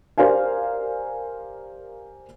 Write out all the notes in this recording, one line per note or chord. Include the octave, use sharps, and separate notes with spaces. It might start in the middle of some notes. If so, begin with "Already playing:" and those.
G4 A#4 C5 D5 F5 G#5